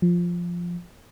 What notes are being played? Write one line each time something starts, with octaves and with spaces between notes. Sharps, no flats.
F3